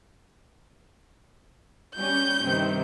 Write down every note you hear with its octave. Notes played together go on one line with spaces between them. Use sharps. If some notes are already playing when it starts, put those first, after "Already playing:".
G3 C#4 G6
G2 C3 D#3